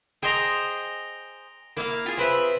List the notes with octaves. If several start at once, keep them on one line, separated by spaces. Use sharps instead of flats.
G#4 C5 D#5 G5 A#5
A#3 E4 F5
F4 G#4
C4 B4 E5